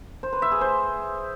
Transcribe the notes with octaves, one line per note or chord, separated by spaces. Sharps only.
C5
B4
E5
G#4
C5